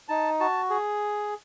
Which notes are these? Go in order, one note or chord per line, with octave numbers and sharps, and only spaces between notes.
D#4 A5
F#4 A5
G#4